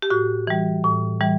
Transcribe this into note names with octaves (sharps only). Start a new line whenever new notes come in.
G4
A2 F#4
E3 G3
A2
E3 G3